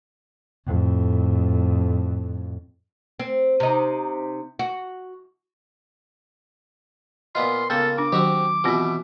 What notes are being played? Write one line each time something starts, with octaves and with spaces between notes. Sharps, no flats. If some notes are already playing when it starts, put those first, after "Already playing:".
F2 A2
C4
C3 D#4
F#4
A#2 B3 F4 D#5 C6
C#2 A#3 B3 A4 C6
D4 D6
D#3 F#3 C4 F#4 G4
B2 E3 C4 F4 G4